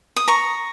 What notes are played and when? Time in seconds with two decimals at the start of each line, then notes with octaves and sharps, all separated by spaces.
0.16 D#6
0.28 A#5 C#6